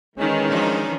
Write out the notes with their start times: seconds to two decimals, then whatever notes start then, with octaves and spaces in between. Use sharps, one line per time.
0.18 D#3 E3 G#3 C#4
0.49 F3 D4 D#4